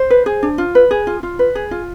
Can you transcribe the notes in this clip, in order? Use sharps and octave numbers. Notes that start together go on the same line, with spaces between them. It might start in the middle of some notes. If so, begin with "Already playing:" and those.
Already playing: C5
B4
G#4
D4
F4
B4
G#4
F4
F4
B4
G#4
F4